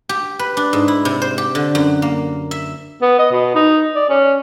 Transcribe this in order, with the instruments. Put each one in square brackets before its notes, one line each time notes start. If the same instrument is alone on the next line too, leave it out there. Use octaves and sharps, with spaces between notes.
[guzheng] G4
B4
D4
G#2
E4
C3
C5
G4
D3
F#2
A#3
E5
[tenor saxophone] B3
D#5
B2
D#4
D5
C#4